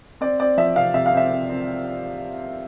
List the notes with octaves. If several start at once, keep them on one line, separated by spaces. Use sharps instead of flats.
C4 D5
C4 D5
F3 E5
C3 F5
C3 E5
F5
C4 E5
C4
C4